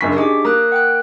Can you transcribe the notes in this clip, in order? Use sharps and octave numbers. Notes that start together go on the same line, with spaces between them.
F#1 F#2 D4 C#6 B6
D#4 G4 G#4 D6
A#3 A#5 D#6 F#6
F#5 G5 F#6